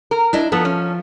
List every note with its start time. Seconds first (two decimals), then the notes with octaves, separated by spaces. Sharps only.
0.11 A#4
0.33 D4 E4 D#5
0.52 F3 B3 A4
0.65 C#4